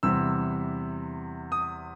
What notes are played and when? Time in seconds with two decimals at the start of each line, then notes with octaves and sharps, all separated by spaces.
0.03 E2 C3 E3 G3 E6
1.52 D#6